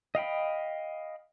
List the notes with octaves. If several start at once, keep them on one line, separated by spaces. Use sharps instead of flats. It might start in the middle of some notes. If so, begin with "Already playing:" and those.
D#5 F5 G5 B5